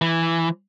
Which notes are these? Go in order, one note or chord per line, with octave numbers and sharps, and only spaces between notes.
E3